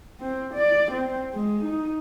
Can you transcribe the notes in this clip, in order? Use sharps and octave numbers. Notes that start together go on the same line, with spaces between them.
C4
D5
C4
G#3
D#4